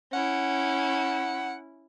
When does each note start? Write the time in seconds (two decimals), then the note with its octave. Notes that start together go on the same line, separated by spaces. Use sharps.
0.13 C#4 E4 F#5